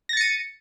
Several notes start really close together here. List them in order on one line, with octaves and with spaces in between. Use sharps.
A#6 A6 C#7 D#7